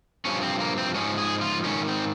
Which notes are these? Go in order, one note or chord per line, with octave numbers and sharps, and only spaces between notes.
G2 F3 C#4
C4
A#3
C4
G#2 F3 C#4
G#4
F4
G#2 D#3 C#4
C4